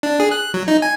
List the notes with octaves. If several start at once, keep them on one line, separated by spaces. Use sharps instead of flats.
D4
G#4
F#6
F#3
D#4
G#5